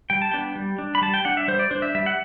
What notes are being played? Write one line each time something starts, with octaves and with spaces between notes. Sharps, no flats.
G3 G5
A5
B3 D4 G5
G3
D4
B5
G3 A5
G5
D4 F#5
E5
G3 C5
D5
D4 C5
E5
G3 E5
F#5